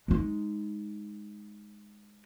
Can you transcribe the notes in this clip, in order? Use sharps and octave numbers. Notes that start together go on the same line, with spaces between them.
G#3 D#4